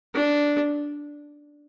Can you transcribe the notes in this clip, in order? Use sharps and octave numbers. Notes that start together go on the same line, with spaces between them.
D4